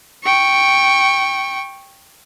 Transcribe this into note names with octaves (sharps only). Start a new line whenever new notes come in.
G5 C#6